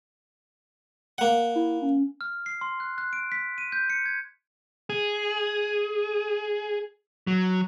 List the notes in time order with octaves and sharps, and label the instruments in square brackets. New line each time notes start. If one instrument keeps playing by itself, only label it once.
[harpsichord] A#3 F#5
[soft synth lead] E4
C#4
[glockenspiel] F6
C7
C6
F#6
F#6
D7
B6
D#7
G6
C#7
G#6
[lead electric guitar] G#4
F#3